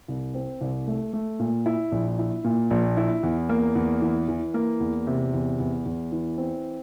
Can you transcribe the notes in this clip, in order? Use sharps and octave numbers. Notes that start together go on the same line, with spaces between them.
C2
C4
C2
A3
A3
A#2
E4
A#1
E4
A#2
A#1
E4
E2
A#3
E2
E3
E3
A#3
E2
C3
E2
E2
E2
E3
C4